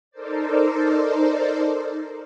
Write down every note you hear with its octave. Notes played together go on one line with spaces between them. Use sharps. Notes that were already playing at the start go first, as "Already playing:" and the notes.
D#4 A4 A#4 C5 D5